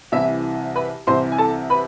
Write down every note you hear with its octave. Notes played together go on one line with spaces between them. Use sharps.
C2 C3 E3 E4 E5
B4 B5
C2 C3 E3 C5 C6
G#5
A4 A5
B4 B5